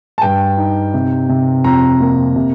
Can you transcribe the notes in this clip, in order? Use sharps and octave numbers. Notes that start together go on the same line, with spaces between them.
A5
G2 G5
D#4
C3
C3
F2 A#5
A#3
C3